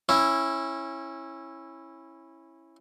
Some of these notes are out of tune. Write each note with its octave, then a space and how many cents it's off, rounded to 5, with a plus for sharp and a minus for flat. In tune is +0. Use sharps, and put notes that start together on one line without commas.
C#4 -25 E4 +0